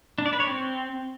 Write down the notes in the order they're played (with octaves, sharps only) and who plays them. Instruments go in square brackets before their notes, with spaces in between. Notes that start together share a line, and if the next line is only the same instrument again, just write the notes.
[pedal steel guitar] D4
D5
B4
C#5
C4